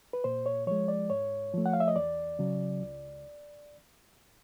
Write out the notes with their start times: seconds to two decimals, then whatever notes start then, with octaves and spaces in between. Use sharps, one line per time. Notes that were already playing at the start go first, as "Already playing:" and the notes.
0.13 B4
0.24 A#2 C5
0.46 C#5
0.67 F3 G#3 C#5
0.88 D5
1.10 G#2 C#5
1.54 F3 A3
1.66 F#5
1.73 F5
1.80 E5
1.88 D#5
1.96 E2 D5
2.39 C#3 F#3
2.82 C#2